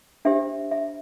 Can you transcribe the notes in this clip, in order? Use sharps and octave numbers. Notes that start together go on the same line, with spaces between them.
D4 G4 C5 E5
E5